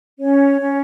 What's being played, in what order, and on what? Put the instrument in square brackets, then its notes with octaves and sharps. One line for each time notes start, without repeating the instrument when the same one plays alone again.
[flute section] C#4 C#5
C#4